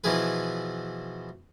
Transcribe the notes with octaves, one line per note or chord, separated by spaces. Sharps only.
B2 E3 F3 E4 G#4 B4